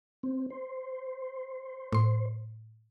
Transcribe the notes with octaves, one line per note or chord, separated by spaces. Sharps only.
C4
C5
A2 C6